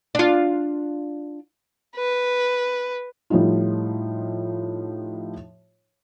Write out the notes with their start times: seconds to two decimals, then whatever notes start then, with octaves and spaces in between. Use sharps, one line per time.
0.15 D4 F4
1.96 B4
3.30 A2 F3 G3 D#4 F4